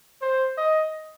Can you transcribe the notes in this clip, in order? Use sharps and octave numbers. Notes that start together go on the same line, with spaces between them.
C5
D#5